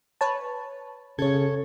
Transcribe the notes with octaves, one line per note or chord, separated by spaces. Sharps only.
B4 C#5 A5
C#3 A4 C#5 G#6